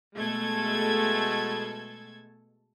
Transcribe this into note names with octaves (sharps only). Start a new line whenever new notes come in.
B2 G#3 A3 A4 G#6